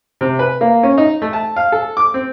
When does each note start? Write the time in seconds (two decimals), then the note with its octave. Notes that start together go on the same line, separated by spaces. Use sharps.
0.21 C3
0.39 B4
0.61 A#3
0.83 C#4
0.97 D#4
1.22 A3
1.33 A5
1.56 F5
1.72 A4
1.97 D6
2.14 C4